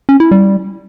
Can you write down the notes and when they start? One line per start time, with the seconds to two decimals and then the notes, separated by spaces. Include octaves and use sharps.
0.09 C#4
0.20 E4
0.31 G3